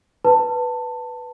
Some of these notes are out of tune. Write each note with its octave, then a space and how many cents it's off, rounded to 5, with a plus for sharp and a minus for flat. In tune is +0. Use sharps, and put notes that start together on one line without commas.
B4 +0 A5 +15